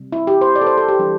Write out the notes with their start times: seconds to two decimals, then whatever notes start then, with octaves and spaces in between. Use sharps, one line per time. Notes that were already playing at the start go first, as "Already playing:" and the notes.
Already playing: C3 G3
0.12 E4
0.27 G4
0.41 C5
0.56 D5
0.61 A4
0.67 C5
0.78 A4
0.88 G4
0.99 E3 G3 D4